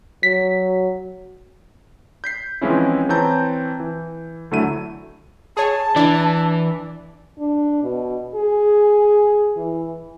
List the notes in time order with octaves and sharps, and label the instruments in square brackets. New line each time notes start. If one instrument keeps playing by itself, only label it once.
[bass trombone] F#3 [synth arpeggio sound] B6
[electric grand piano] G6 B6 C7
E3 F3 G#3 C4 C#4 E4
E3 C4 C#5 A5 A#5 G6
E3
D2 D3 F#3 A3 E4 D#7
[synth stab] G#4 C#5 [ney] A5
[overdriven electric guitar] E3 [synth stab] D4 D5
[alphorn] D4
B2
G#4
E3